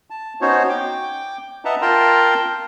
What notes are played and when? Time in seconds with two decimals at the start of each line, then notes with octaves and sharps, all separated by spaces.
0.10 A5
0.41 B3 C#4 D#4 F#4 C5 C#5
0.69 G5 D6
1.65 B4 D#5 E5 F#5 A5 A#5
1.82 F4 A#4 G5 A5 A#5 C6